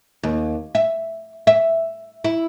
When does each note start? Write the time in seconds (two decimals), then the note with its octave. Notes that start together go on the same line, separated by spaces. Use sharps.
0.23 D#2
0.75 E5
1.47 E5
2.24 E4